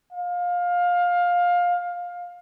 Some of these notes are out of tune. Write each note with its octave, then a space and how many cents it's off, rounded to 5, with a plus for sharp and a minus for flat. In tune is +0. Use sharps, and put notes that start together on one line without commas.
F5 +20